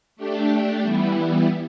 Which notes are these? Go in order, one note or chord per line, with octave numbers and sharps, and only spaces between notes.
A3 D4 G4
E3 G3 B3 E4